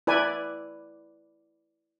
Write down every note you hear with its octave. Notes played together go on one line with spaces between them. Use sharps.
E4 B4 D5 G#5